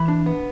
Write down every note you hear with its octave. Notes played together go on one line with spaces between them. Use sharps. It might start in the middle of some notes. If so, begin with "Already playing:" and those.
Already playing: E3 B5
D4
B3